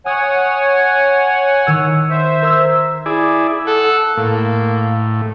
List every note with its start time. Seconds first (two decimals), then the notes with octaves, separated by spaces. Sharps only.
0.06 C#5 F#5 G#5 D#6
1.67 D#3 E6
2.10 C5 E5
2.42 A#4 E6 G#6
3.06 E4 G#4 D5
3.67 A4 F#5
4.17 A2 A#3